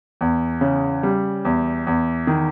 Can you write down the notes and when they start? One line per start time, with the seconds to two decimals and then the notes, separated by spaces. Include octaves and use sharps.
0.21 E2
0.61 C#3
1.03 G3
1.45 E2
1.87 E2
2.27 D#3